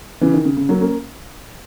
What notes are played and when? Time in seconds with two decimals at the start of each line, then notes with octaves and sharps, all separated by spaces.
0.21 C#3 E3
0.33 D#3
0.45 C#3
0.57 C#3
0.69 F#3 A#3
0.80 A#3 C#4